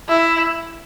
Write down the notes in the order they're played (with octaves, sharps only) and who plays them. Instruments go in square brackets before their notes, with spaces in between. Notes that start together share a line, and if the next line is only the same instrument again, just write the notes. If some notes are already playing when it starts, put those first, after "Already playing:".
[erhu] E4